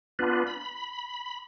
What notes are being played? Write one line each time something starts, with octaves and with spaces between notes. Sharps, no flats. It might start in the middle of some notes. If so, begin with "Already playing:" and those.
B3 D4 F4 B4
B5